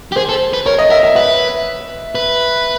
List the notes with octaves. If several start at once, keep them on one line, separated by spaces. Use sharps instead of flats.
G4
G#4 C5
A4
B4
A#4 C#5
D#5
A#4 E5
E5
B4 E5
B4